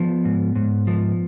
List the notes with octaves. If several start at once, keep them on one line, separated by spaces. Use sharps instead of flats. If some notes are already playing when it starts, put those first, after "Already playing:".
Already playing: F3 B3
G#2
G#2
F3